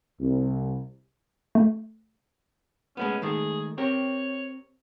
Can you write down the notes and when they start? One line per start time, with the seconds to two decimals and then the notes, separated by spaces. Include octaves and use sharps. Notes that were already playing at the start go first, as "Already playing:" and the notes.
0.20 C2
1.55 A3
2.97 G#3 A3 B3 C#4
3.22 D#3 G#3 A3 G#4
3.78 C4 G4 A#4 C#5